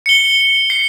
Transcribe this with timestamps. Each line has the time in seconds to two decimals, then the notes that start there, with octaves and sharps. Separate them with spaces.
0.06 C#7 G7
0.70 C7